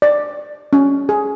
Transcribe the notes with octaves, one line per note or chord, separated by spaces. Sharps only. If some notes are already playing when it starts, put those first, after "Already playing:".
D5
C#4
G#4